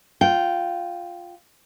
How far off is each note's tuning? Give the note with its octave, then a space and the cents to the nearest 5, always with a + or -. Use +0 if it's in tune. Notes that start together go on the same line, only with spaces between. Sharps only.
F4 +0 G5 -10